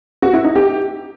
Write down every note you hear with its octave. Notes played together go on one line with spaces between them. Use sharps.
F#4
E4
D#4
G4